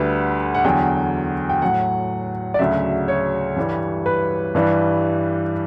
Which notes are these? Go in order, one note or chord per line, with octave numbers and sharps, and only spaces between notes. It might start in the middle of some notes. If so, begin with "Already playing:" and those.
Already playing: D2 D3 G3 B4
F#5
E2 D3 F#3 G5
G5
A2 F#3 F#5
D5
D2 C#3 F#3 E5
C#5
G2 E3 G3
B4
G2 E3 G3